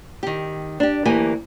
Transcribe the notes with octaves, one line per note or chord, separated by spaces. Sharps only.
D#3 G4
D4 G4
D2 E3 A#3 G4 G#5